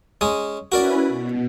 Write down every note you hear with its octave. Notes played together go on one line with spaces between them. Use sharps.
G#3 C#4 D#6
C#4 E4 F#4 A#4 B4 D5
B2